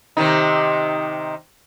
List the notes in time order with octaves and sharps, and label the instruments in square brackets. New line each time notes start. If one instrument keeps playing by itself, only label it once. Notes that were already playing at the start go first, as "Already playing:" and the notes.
[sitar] C3 D#3 D#4